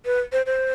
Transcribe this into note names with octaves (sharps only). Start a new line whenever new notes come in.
B4
C5
C5